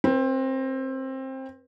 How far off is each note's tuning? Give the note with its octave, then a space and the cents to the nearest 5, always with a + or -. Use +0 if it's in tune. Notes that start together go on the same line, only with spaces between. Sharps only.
C4 +20 B4 -20